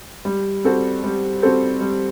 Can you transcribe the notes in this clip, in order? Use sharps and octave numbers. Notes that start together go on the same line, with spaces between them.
G3
C4 F#4 A4 C5
G3
C4 F#4 A4 C5
G3